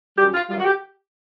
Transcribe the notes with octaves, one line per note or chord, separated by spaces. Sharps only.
F#2 D#3 G3 G4
F4
F#2 D#3 G3 F4
F#4
G4